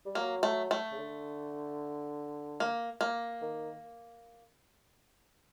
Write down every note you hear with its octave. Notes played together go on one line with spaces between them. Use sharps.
G3
F#3 A#3
A3
A3
C#3
D3
A#3
A#3
D#3